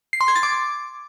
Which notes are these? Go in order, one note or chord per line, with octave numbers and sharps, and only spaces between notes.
C7
C6
G#6
A6
D6